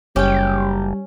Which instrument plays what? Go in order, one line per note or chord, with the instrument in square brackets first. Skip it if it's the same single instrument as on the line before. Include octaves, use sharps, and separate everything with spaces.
[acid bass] F#1 [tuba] G3 [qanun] C#4 [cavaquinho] G4 G5